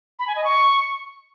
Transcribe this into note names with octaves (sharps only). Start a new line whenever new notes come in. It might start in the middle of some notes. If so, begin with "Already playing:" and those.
B5
G#5
D#5
C#6